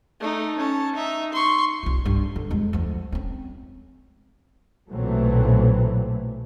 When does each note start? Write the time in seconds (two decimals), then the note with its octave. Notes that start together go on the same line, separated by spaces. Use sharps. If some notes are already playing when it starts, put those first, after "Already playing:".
0.20 A3 D#4
0.58 C#4 A5
0.95 D#4 E5
1.32 C6 C#6
1.83 C2 F4
2.05 G2
2.36 D3
2.50 F2 G#3
2.73 D2 F3
3.12 C4 C#4
4.91 B1 A#2 E3 F#3 A3 C4